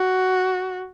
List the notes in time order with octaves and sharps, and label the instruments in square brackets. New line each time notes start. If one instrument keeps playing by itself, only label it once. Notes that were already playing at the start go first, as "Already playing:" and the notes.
Already playing: [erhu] F#4